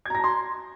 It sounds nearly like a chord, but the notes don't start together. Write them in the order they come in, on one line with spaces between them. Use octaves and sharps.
G#6 A#5 A#6 A5 C6